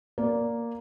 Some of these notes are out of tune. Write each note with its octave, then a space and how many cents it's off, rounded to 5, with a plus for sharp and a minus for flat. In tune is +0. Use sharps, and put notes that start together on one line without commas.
A#3 +0 D5 -15